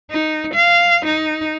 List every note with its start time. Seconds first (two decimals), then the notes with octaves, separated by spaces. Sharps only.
0.11 D#4
0.55 F5
1.06 D#4